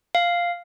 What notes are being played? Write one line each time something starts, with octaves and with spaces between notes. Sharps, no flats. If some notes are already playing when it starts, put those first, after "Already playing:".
F5